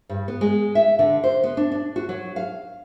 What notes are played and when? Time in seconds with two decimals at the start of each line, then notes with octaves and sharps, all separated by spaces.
0.09 G2
0.28 B3
0.41 G#3
0.75 E5
0.99 D3
1.24 C5
1.44 B3
1.57 D4
1.72 D4
1.96 F#4
2.09 F#3
2.36 F5